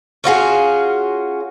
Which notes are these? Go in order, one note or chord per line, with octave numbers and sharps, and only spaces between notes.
C#4 F4 F#4 G#4